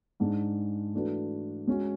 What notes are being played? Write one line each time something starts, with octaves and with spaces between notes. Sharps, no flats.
G#2 G#3 D4 G#4
E3 A3 D4 F#4 B4
G#3 C#4 F#4